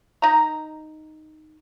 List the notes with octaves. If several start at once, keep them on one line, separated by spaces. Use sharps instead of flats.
D#4 A#5